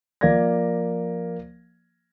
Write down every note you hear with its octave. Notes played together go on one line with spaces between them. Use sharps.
F3 A#3 D5 F5 G#6 A#6